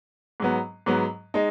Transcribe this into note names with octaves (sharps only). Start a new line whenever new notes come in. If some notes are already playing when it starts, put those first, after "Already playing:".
G#2 F#3 B3
G#2 F#3 B3
G#3 D#4